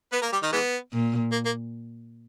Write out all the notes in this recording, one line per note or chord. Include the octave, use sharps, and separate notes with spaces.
B3 B4
A#3 A#4
G3 G4
D#3 D#4
E3 G#3 B3
A#2
A#3
A#3